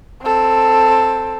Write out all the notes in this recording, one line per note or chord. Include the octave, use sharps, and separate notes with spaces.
C4 A4